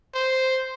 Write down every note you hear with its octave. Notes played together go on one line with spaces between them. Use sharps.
C5